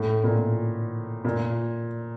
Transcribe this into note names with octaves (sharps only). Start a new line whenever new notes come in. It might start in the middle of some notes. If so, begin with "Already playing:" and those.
Already playing: A2
A#2
A#2